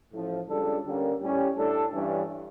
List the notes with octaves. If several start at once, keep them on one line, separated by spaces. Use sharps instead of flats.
A1 A2 F3
C#2 C#3 G3 D4 A4
D3 G3 A#3 C#4
A2 G3 C#4 G4
A2 G3 D4 A4
G2 E3 G3 C#4